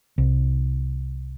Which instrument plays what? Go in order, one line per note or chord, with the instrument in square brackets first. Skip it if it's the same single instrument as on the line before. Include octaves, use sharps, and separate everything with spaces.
[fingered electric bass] C2